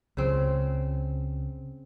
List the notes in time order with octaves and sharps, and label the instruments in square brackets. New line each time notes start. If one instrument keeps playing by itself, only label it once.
[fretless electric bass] C#2 [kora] C#3 C4